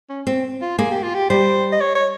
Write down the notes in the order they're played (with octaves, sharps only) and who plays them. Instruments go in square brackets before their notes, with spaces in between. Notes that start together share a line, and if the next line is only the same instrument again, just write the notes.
[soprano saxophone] C#4
[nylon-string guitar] C4
[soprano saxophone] F4
[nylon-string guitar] A#3 [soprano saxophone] G#4
[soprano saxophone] G4
F4
G4
[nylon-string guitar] G3 [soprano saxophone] C5
[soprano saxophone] D#5
C#5
C#5